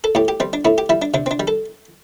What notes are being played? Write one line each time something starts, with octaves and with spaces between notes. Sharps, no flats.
A4
A2 G4
G4
G3 C4
D4
A2 E4
G4
G3 E4
D4
C3 D4
C4
D4
G3
A4